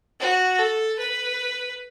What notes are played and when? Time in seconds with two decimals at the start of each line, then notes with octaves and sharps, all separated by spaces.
0.20 F#4
0.59 A4
0.99 B4